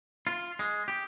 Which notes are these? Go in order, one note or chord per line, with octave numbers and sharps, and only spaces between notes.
F4
G#3
G4